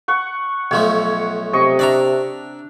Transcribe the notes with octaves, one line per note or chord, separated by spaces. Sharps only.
F#5 C#6
B1 F3 A3 C#5
C3 D#5 C#6
D4 D5 E5 A#5